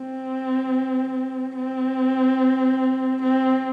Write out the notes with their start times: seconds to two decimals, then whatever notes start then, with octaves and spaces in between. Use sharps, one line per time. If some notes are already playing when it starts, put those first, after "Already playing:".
Already playing: C4
1.56 C4
3.22 C4